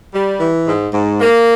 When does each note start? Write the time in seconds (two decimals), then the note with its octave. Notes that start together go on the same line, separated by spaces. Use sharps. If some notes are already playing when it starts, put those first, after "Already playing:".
0.14 G3
0.40 E3
0.67 G#2
0.93 G#2
1.21 A#3